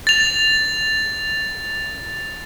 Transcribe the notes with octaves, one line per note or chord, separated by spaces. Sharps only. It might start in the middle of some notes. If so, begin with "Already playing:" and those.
A6 F7